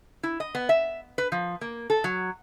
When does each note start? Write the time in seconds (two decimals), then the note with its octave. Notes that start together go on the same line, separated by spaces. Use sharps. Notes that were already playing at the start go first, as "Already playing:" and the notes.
0.23 E4
0.40 D#5
0.55 B3
0.69 E5
1.18 B4
1.32 F3
1.61 A#3
1.90 A4
2.04 F#3